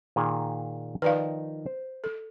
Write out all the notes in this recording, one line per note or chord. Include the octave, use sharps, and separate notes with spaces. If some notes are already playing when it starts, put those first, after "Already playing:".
A#2 D#3 G#4
D#3 F3 D#4 B4 D5 F5
C5
A4